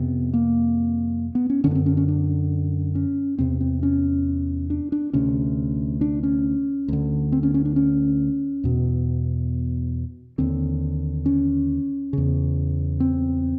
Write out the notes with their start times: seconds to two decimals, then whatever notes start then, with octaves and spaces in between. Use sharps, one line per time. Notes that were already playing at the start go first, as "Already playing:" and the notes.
Already playing: F2 C3 B3
0.33 A#3
1.35 B3
1.50 C#4
1.64 D3 C#4
1.67 F#2 B3
1.75 C4
1.86 C#4
1.97 C#4
2.08 D4
2.95 C#4
3.38 E2 C3 C4
3.61 C4
3.83 C#4
4.70 D4
4.92 D4
5.13 D2 C3 C#4
6.01 D4
6.23 C#4
6.88 D2 D3
7.32 C4
7.43 C#4
7.54 C#4
7.65 D4
7.76 C#4
8.64 E2 B2
10.38 D#2 D3 C4
11.26 C#4
12.13 E2 C#3
13.00 C4